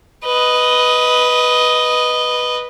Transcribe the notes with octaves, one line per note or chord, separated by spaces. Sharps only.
B4 D#5